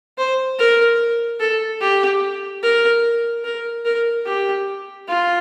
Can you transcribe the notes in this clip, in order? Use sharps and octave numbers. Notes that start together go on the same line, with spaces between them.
C5
A#4
A4
G4
A#4
A#4
A#4
G4
F4